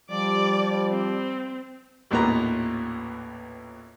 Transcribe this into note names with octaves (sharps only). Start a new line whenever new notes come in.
F3 G3 D5 D6
C4
A1 D#2 A#2 B3 B4 A#5